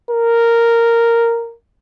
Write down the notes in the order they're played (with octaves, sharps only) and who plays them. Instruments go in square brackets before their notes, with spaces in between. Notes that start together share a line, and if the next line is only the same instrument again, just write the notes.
[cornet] A#4